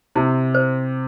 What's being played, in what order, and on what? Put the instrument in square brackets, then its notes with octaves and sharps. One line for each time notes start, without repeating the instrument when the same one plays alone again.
[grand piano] C3 [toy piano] E4
[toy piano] C5